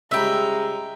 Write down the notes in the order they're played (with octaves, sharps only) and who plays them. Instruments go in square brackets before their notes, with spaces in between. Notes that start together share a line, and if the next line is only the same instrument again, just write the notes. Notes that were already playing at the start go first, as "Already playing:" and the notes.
[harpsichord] C#2 G3 B4 [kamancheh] G#3 A#5 [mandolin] E5 G5